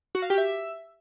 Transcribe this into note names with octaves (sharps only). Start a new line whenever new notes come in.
F#4
F5
G4
E5